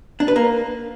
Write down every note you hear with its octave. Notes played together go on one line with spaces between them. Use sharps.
D4
B4
A#3